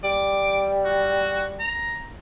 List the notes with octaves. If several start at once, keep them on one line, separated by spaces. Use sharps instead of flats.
G3 D6
F#4
A#5